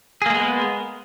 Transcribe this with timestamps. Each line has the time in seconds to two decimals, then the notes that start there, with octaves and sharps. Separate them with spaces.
0.22 G#4
0.26 A#3
0.30 G#3
0.34 B3